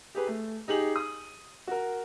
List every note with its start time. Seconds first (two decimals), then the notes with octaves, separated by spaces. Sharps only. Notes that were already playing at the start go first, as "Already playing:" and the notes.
0.15 G4 G#4 B4
0.27 A3
0.68 D#4 G4 G#4 F#7
0.96 D#6
1.67 F#4 A#4